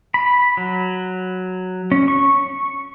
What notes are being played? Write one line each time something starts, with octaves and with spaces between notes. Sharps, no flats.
B5
F#3
C#4
C#6